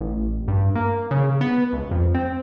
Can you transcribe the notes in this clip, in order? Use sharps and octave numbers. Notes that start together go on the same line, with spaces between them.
A1
G2
A#3
C#3
B3
C#2
F2
C4